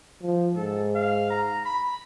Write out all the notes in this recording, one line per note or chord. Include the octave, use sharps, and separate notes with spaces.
F3
G#2 A4
F5
A#5
B5